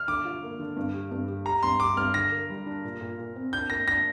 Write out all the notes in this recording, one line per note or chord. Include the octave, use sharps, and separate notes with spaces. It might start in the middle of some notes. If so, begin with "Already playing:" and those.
Already playing: F6
D3 D6
F4
A#3
D3
G2
G4
G2
G4
G4 A#5
G2 C6
G4 D6
G2 F6
D3 A#6
A#4
G3
D4
A#2
A#2
A#2
C4
D4 G6
A#3 A#6
D4 A#6